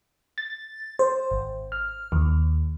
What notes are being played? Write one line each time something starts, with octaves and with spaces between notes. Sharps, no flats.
A6
C5
G#1
F6
D#2